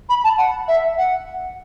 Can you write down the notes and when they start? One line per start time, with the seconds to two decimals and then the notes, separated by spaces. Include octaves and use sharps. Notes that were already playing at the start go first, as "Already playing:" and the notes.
0.09 B5
0.24 A5
0.38 F#5
0.68 E5
0.98 F#5